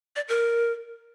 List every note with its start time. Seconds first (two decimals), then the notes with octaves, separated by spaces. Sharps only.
0.16 D5
0.28 A#4